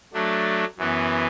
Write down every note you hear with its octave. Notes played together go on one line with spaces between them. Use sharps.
F#3 A3 D4
F#2 E3 B3